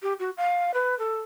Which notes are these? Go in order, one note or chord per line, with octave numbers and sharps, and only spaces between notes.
G4
F#4
F5
B4
A4